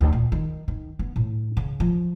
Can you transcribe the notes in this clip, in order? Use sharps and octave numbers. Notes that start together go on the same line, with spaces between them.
D2
A#2
D#3
D#3
B3
A2
C#3
F3